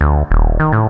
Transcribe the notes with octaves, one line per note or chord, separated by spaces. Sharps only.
D2
D#1
D#3
A2